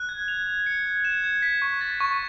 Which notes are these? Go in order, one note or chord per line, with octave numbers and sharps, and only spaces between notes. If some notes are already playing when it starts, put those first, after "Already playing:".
Already playing: F#6
G#6
F7
G#6
C#7
G#6
E7
G#6
B6
C#6
A6
C#6